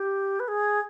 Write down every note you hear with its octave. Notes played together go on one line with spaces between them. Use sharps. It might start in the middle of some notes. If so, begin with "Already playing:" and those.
Already playing: G4
B4
G#4